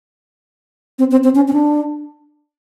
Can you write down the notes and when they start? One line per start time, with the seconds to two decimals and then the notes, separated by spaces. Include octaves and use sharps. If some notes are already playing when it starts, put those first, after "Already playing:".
0.99 C4
1.11 C4
1.24 C4
1.35 C#4
1.48 C#4
1.53 D4